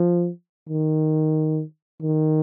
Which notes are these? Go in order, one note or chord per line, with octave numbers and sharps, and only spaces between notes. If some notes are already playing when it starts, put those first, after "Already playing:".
Already playing: F3
D#3
D#3